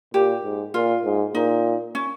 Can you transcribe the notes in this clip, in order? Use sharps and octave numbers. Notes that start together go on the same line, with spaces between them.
A#2 G4
G#2
A#2 F4
G#2
A#2 D#4
C#4